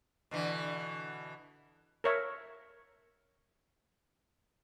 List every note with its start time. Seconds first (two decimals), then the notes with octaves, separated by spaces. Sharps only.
0.31 B2 D3 E3
2.04 A#4 C#5 E5